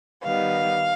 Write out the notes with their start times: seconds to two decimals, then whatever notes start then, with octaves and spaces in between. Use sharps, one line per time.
0.23 D#3 G3 B3 F5